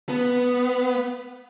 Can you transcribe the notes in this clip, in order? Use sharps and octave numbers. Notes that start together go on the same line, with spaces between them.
B3